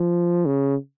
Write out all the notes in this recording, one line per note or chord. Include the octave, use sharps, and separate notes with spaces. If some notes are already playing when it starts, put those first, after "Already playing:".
Already playing: F3
C#3